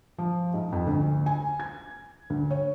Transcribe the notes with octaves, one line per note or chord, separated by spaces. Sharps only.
F3
G#2
F2
D2
G#5
G#6
D2
C#5